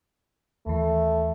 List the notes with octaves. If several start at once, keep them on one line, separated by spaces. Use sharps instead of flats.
D#2 E3 A3